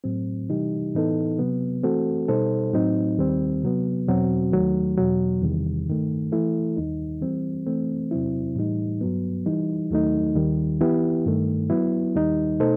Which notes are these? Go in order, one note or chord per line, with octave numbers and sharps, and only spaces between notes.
A2 F#3 C4
C3 E3 G3 D#4 G4
A2 E3 B3 D#4 A4
C3 F#3 B3
E3 A3 C4 F#4 A4
B2 G3 D#4 A4 C5
A2 F#3 C4 D#4
D#2 D#3 G3 C4
C3 F#3 B3
E2 B2 F#3 C4 F#4
D#2 D#3 F#3 A3
E2 B2 F#3
E2 C3 D#3 G3
G2 D#3 A3
E3 A3 E4 A4
D#2 D#3 G3 D#4
E3 G3 C4
E3 A3 C4
E2 C3 F#3 C4 E4
A2 E3 G3 D#4
G2 F#3 B3
E3 G3 D#4
D#2 D#3 F#3 A3 D#4
D#2 D#3 G3
E3 B3 E4 G4
G2 D#3 A3
F#3 B3 E4
D#2 D#3 G3 D#4
B2 A3 D#4 A4 C5